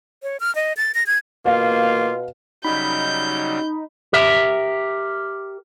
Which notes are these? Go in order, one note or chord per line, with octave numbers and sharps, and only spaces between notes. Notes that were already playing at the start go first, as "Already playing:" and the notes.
C#5
F6
D#5
A6
A#6
G#6
B2 A#3 F4 F5
C#3 F#3 G3 D#4 B5 G6
G4 A#4 E5